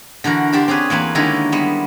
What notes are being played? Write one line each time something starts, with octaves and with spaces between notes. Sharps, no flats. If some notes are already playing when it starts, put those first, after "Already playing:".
D3 E3 F#4 A#4
D4 G4 C5 D5
C4 C#4 G#4 B4
E2 A#3 C4 B4
D3 D#3 G#3 C#4 E4 G4
G3 G#3 B3